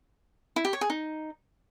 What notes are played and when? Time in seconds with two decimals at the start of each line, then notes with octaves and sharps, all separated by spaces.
0.56 E4
0.65 G4
0.73 C#5
0.81 G#4
0.90 D#4